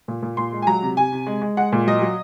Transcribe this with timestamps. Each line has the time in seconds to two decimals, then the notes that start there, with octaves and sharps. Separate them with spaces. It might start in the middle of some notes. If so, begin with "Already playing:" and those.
0.08 A#2
0.22 A#2
0.37 A#2 C6
0.52 G#3
0.62 G#5
0.67 F#3 A#5
0.83 C3
0.97 C3 G#5
1.12 C3
1.27 G#3
1.42 G#3
1.57 G#3 F#5
1.72 A#2
1.87 F#3 D#5
2.02 F#3